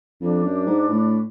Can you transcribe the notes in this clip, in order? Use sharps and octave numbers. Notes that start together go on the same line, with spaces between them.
F2 D4
F#2
G#2
A2